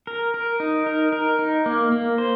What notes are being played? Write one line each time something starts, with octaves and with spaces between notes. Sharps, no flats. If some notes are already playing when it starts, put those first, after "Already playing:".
A#4
A#4
D#4
A#4
A#4
D#4
A#3
A#3
C5